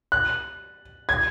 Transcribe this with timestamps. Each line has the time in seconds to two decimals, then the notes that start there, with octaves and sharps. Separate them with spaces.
0.12 F#6
1.09 G#6